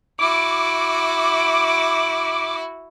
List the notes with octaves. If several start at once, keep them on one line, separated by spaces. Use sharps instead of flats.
E4 F#4 D6